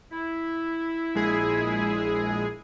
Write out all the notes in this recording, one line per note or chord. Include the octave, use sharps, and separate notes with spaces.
E4
A#1 G#3 G#4